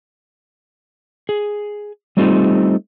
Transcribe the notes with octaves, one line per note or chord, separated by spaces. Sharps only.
G#4
G3 A3 C4 D#4 F4 G4